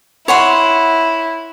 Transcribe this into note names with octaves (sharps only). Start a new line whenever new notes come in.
E4 C#5 F#5 C6